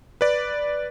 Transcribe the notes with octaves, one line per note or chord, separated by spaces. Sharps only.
B4 D5